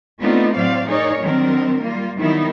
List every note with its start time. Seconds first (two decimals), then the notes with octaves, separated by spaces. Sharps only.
0.20 A3 B3 C4 D4 D#4 F4
0.56 A2 F#3 C4 C5 D5 F5
0.88 D#4 G#4 A#4 C#5 D5
1.21 D#3 F#3 G3 C4 D4 A#4
1.80 G3 A#3 F4
2.17 D#3 F#3 G3 B3 D#4 E4